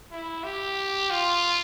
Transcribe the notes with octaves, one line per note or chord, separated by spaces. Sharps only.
E4
G4
F4